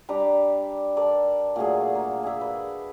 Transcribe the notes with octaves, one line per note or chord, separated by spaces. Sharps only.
G3 D4 A#5 D6
A4 A#4 D5 A5
A#2 F#3 A3 G#4
A#3 E5
G#4 E5
B4